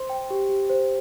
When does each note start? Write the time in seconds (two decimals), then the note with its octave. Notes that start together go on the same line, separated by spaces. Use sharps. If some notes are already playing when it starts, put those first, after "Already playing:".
Already playing: C5 C6
0.10 G5
0.30 G4
0.49 G4
0.70 C5